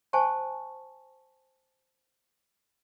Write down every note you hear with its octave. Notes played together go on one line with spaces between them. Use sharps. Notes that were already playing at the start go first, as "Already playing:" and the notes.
C5 F#5 G#5 A5 C#6